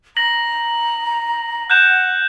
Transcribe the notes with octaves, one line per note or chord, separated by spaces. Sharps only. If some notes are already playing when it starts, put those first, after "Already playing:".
A#5 A#6 F#7
F#5 F#6 G6 E7